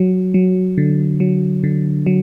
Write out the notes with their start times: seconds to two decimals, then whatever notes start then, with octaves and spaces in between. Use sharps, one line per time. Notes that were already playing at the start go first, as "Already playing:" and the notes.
Already playing: F#3
0.34 F#3
0.78 D3
1.20 F#3
1.64 D3
2.06 F#3